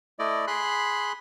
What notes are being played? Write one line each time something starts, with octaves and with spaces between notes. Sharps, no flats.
A3 E4 D5 D#5
G#4 B5 C6 F#6